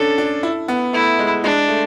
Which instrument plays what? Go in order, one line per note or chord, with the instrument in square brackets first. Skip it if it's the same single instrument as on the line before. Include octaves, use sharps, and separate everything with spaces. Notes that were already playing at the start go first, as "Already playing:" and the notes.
Already playing: [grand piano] C#4 D4 [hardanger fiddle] A4
[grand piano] D4
E4
B3
[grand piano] A3 [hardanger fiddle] E4
[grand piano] G#3
[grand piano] G#3 [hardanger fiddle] D4
[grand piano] A3